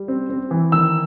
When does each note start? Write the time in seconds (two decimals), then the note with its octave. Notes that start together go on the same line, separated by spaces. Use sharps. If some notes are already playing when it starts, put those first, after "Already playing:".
Already playing: G3
0.08 C4
0.29 C4
0.51 E3
0.72 D#3 E6